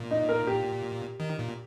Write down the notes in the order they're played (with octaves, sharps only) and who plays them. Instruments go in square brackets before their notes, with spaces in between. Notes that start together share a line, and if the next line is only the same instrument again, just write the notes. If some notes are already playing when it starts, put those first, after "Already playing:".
Already playing: [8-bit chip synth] A#2
[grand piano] D#4
A#4
G4
[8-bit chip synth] D#3
A#2